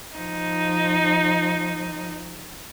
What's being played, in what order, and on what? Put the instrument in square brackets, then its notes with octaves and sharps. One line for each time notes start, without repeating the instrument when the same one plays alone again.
[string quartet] F3 D#4